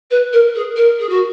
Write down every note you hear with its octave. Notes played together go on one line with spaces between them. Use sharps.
B4
A#4
G#4
A#4
G#4
F#4